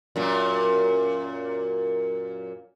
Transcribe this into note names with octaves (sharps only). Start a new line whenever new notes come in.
F#2 A#2 A#3